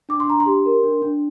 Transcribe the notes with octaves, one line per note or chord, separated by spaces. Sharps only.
D4 D6
C6
D4 A#5
C6
G4
A#4
D4
D4